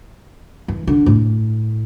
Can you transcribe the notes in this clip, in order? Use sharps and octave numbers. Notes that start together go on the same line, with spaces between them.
E3
D3
A2